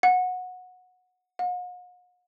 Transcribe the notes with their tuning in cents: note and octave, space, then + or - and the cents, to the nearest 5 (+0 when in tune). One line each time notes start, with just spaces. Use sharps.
F#5 -20
F#5 -45